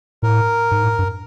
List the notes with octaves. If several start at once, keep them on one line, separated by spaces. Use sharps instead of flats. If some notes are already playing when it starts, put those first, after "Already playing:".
A2 A#4
G#2
A2
G2